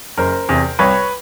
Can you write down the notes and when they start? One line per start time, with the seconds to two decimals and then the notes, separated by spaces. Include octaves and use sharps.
0.17 F#1 A#4 C5
0.49 E2 C3
0.79 C2 B4 C#5